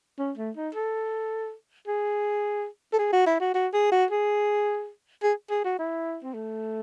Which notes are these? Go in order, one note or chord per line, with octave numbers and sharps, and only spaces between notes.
C#4
A3
D#4
A4
G#4
A4
G#4
F#4
E4
F#4
F#4
G#4
F#4
G#4
G#4
G#4
F#4
E4
C4
A3